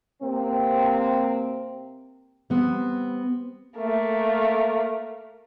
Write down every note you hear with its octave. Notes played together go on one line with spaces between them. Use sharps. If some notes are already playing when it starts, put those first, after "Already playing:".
C3 A#3 C4
G3 B3 C4
A3 A#3